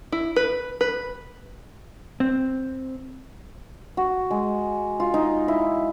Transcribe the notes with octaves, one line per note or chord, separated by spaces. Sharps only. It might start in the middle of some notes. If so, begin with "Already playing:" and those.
E4
B4
B4
C4
F#4
G#3
F4
D#4
E4